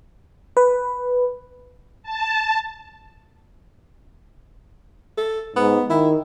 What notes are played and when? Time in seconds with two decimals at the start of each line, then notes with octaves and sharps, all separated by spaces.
0.57 B4
2.03 A5
5.17 A4
5.56 G#2 B3
5.90 D#3 E4